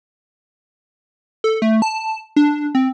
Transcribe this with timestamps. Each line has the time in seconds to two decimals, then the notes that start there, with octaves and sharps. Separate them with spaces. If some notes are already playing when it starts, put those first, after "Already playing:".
1.44 A4
1.62 A3
1.82 A5
2.36 D4
2.75 C4